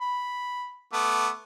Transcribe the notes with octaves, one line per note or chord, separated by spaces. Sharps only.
B5
A3 B3 D6